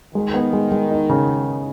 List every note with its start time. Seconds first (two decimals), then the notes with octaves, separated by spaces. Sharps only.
0.15 D#3 G#3
0.34 B3
0.53 G#3
0.72 G#3
0.91 D#4
1.09 C#3